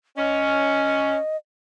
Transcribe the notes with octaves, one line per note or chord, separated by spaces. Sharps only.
C#4 D#5